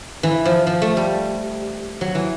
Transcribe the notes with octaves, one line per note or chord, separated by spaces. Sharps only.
E3
F3
F3
A3
G3
F#3
E3